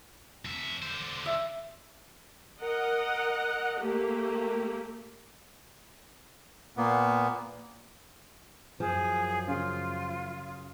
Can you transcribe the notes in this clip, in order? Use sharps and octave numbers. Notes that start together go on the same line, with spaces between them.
F2 E5
D3 C5
E5
A#4 D#5 F#5
A3 A#3 G4
A#2 A#3 B3
F#2 F3 G#4
C#3 C#4 F4